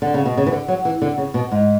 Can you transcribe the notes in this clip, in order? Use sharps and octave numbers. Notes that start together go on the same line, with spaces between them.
D3
C#3
B2
C#3
E3
D3
F#3
E3
D3
C#3
B2
G#2